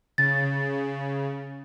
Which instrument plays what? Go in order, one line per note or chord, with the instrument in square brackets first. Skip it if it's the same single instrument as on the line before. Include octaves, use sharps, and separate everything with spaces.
[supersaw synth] C#3 [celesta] A6